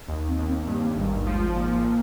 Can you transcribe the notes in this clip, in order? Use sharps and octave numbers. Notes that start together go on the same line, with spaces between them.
D#2
C4
D#2
C4
G2 A#3
G#1 G3
F3 G#3
A#2 A#3
A#2